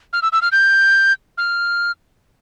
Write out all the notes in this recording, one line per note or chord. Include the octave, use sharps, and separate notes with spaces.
F6
E6
E6
F6
G6
F6